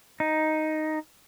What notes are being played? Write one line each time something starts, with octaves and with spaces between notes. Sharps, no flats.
D#4